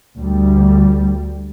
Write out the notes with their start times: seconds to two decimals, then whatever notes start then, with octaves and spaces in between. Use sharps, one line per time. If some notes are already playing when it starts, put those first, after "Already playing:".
0.18 D2 G3